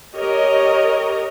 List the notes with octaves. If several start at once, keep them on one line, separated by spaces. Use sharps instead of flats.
G4 A#4 C#5 D#5